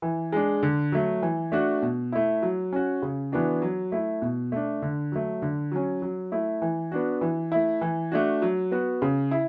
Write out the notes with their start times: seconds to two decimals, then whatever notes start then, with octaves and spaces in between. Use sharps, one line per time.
0.02 E3
0.32 G#3 D4
0.63 D3
0.92 F#3 A3
1.22 E3
1.52 A3 D4 F#4
1.82 B2
2.12 A3 E4
2.42 F#3
2.73 C#4 F#4
3.02 C#3
3.32 E3 B3 D4 F#4
3.62 F#3
3.92 A3 E4
4.22 B2
4.52 A3 D4
4.82 D3
5.12 F#3 A3
5.42 D3
5.72 F#3 C#4
6.02 F#3
6.32 A3 E4
6.62 E3
6.92 B3 D4 F#4
7.21 E3
7.52 A3 E4
7.81 E3
8.12 A3 D4 F#4
8.42 F#3
8.72 B3 F#4
9.02 C#3
9.31 E4